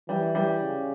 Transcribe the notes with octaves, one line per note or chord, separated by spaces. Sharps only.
E3 G3
G3
C#3